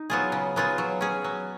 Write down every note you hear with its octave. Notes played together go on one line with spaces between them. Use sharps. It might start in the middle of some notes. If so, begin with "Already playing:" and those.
Already playing: D#4
F#3 B3 F4 G#4
C#3
F#3 B3 F4 G#4
F#3
C#4 G#4
F#3